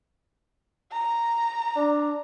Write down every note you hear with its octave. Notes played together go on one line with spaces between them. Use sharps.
A#5
D4